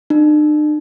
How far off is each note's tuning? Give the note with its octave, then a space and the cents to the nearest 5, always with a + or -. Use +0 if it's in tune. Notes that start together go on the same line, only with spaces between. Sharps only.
D4 +45